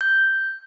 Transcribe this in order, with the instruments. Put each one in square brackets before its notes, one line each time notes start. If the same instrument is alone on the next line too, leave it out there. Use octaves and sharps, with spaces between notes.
[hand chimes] G6